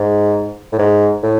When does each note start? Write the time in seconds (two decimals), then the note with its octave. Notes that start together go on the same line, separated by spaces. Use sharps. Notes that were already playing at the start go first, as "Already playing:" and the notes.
Already playing: G#2
0.73 A2
0.79 G#2
1.23 A2